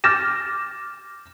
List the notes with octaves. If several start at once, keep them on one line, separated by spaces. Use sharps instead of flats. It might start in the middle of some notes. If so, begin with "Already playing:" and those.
D6 F6 G6 A6 A#6 E7